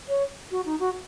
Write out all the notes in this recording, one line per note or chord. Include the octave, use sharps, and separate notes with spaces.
C#5
F#4
D#4
F#4